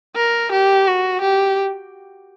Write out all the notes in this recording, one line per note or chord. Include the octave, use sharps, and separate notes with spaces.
A#4
G4
F#4
G4